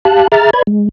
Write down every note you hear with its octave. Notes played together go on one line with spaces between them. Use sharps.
G4 F5 A5 F#6
G#4 E5 A#5 F6 A6
B4 D5 B5 G#6
G#3